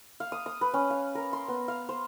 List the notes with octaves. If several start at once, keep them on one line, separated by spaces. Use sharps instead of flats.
F5
D#6
D#6
B4
C#4
F5
A#4
C6
B3
F5
C5